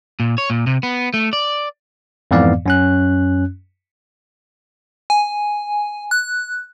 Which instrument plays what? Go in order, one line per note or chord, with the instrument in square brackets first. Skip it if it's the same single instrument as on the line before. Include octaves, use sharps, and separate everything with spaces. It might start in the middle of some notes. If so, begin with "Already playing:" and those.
[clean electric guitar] A#2
C#5
A#2
C3
B3
A3
D5
[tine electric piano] F2 G#2 E3 B3 D5 F5
F#2 C#4 F#6
[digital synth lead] G#5
F#6